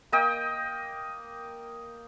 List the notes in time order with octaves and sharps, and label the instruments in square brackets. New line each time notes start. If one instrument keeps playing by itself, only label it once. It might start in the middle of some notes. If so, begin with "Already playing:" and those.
[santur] A#3 D#5 G5